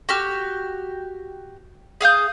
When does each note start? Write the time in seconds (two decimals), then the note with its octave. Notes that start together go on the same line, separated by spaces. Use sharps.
0.09 F#4 G4 F6
2.01 G#4 F5 D#6 G6